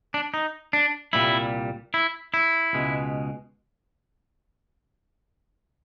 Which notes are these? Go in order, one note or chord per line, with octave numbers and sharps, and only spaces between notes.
D4
D#4
D4
C2 A#2 G3 E4
E4
E4
C#2 B2 G#3